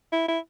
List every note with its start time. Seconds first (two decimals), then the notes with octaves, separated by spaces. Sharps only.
0.13 E4
0.28 E4